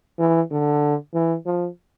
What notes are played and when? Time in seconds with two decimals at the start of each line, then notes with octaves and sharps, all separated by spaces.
0.19 E3
0.51 D3
1.14 E3
1.46 F3